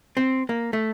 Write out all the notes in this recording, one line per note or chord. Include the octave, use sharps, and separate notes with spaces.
C4
A#3
A3